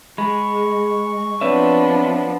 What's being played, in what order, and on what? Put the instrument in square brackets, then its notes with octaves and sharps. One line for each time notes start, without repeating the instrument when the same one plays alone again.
[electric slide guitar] G#3 [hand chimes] G#4 G#5 B5 [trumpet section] C#6
[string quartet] F3 B3 D4 [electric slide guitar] C4 B4 E5 [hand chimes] C#5 D5